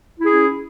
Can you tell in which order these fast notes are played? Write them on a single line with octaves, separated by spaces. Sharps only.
E4 G#4 C#4